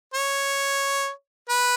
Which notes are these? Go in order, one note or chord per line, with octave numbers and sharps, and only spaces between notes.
C#5
B4